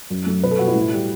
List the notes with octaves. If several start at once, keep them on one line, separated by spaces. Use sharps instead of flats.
F#2
F#3 A3
B2 B4
A4
G3 F#4
E4
A2
G3